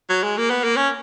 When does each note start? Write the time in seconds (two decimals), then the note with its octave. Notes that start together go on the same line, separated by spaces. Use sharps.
0.09 F#3
0.23 G#3
0.38 A#3
0.50 B3
0.64 A#3
0.77 C#4